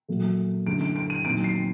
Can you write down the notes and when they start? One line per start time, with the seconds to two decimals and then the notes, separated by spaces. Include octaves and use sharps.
0.08 A#2 F#3 A3
0.66 F#2 D3 A3 D7
0.81 D7
0.96 D7
1.10 D#7
1.25 A#2 F#3 C4 D#4 D7
1.44 C7